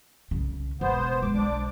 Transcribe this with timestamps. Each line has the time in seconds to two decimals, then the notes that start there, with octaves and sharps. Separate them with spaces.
0.31 C2 C#3
0.81 E1 B3 C5
1.22 G#3 D6
1.35 B1 D4 D6